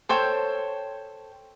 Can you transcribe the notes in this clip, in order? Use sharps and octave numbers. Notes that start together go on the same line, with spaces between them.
A4 C5 C#5 G5